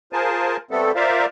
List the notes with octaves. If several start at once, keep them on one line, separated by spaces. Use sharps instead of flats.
F4 G#4 A#4 C5 G#5 A5
G3 A3 B3 C4 A4
F4 A#4 C5 D5 E5 F5